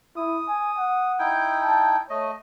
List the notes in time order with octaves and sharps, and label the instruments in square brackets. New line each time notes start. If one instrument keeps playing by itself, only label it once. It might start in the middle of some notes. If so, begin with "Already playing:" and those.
[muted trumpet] E4 [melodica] D#6
[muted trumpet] G#5
F#5
[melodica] D#4 E4 G5
[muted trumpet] A5
[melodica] A3 D#5 [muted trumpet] C#5